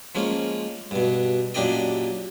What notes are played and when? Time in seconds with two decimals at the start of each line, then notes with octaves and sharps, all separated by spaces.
0.15 F3 G#3 A#3 C#4
0.91 G2 B2
1.54 F#2 A#2 D4 G4 D5 D#5